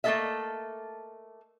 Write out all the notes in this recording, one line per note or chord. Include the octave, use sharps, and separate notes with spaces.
A3 A#3 D4 A4 D#5 E5